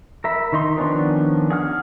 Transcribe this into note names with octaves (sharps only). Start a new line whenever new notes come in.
A#4 E5 B5
D#3 D#4 C6
D#3 F3 B3 C#4 D4
G#4 F#5 F6